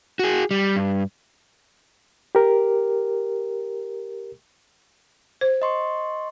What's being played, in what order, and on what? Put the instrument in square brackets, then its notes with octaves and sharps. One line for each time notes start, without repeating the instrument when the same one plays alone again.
[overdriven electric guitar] F#4 G#4
G3
G2
[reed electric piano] G4 A#4
[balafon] C5
[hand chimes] D#5 C6 C#6